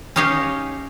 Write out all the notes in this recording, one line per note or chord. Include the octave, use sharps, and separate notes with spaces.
C#4 D#4 G4 C#5 F5